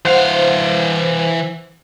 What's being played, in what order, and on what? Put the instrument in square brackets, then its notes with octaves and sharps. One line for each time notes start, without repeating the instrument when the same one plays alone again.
[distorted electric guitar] E3 F5 [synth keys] C5 F#5